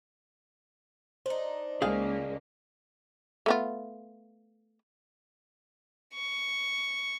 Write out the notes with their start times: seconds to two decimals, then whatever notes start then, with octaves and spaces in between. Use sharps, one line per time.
1.26 D4 D#4 C5
1.82 C#2 A#3 G#4 F5
3.46 A3 B3 F4
6.14 C#6